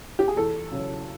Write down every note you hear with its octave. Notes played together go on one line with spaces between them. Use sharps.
G4
G#4
E2 A4
C#3 F#3